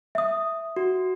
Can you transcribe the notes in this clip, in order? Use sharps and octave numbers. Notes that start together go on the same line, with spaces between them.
E5 D#6
F#4